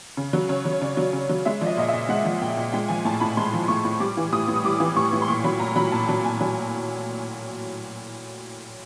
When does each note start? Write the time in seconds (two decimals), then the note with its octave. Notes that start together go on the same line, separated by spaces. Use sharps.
0.17 C#3
0.33 F#3
0.49 C#3 C#5
0.65 F#3
0.72 C#5
0.81 C#3 D5
0.97 F#3
1.13 C#3
1.29 F#3
1.45 G#3 E5
1.61 F3 D5
1.67 D#5
1.77 A#2 D#5
1.89 E5
1.93 A#2
2.09 G#3 F#5
2.25 F3
2.42 A#2 G5
2.57 A#2
2.73 G#3 G5
2.88 F3 G#5
3.05 A2 A5
3.20 A2 B5
3.37 G#3 C6
3.53 F3
3.68 A2 C#6
3.85 A2
4.00 G3 D6
4.17 E3
4.32 A2 D#6
4.48 A2
4.56 D#6
4.64 G3 D6
4.80 E3
4.96 A2 C#6
5.13 A2
5.22 C6
5.28 A#2 C#6
5.44 F#3 B5
5.60 A#2 A#5
5.76 F#3 B5
5.92 A#2 A5
6.09 F#3
6.24 A#2 G#5
6.41 F#3